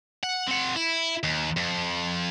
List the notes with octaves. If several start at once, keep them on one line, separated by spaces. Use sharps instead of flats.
F#5
C4 F#5
E4
D#2
F2